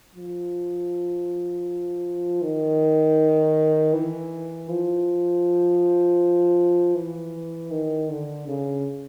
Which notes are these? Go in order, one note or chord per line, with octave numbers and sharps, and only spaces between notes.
F3
D#3
E3
F3
E3
D#3
D3
C#3